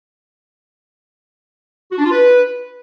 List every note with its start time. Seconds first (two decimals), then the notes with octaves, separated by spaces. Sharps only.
1.91 F#4
1.98 D4
2.05 F4
2.11 B4